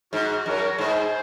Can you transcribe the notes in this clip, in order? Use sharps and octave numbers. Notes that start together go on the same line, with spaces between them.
G#2 F#4
F#2 A#4 C#5
G#2 G#4 C5